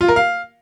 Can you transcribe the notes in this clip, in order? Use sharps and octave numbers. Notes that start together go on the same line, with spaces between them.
F4
A#4
F5